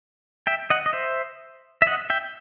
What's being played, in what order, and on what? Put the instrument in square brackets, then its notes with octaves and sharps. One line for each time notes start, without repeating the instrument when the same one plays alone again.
[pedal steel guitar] E5 G5
D#5 F#5
D#5
C5 E5
E5
D#5 F#5
E5 G5